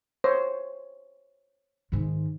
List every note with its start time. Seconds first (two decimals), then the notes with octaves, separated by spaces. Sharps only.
0.24 C5 C#5
1.92 G#2 D#3